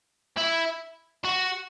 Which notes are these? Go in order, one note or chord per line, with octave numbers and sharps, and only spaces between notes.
E4
F#4